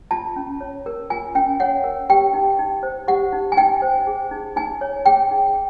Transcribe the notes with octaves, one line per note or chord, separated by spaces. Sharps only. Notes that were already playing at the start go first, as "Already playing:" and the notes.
F4 A5
C#4
C#5
A#4
F4 G#5
C#4 G5
C#5 F#5
A#4
G4 G5
D#4
D#4
C5
G4 F#5
D#4
G#5
D#4 G5
C5
G#4
D#4
D#4 G#5
C#5
G#4 G5
D#4